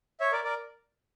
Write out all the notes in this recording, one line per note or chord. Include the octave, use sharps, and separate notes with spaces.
C#5 E5
A#4 D5
A#4 D5